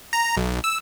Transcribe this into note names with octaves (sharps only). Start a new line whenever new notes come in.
A#5
B1
E6